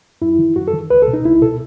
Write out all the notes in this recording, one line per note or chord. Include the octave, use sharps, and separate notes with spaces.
F#2 E4
D#3
F#2 F#4
A4
D#3
C#2 B4
A4
B2
D#4
C#2 E4
B2 A4